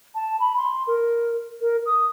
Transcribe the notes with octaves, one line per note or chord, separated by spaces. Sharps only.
A5
B5
C6
A#4
A#4
D#6